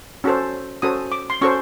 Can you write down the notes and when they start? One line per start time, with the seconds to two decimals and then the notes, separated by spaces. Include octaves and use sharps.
0.24 C#4 F#4 A4 C5
0.82 C#4 F#4 A4 C5 D#6
1.12 D6
1.30 C6
1.41 C#4 F#4 A4 C5 C#6